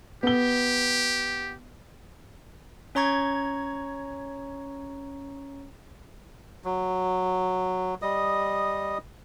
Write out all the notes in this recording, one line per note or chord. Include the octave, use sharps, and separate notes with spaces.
B3 G4 G7
C#4 C#5 A#5 C#6 G#6
F#3
G3 D#5 D#6